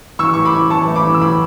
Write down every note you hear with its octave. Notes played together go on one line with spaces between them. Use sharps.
E3 C#6 E6
A2 C#6
B5 D6
A2
E3 A5 C#6
A3
B5 D6
E3
E6
A2 B5 D6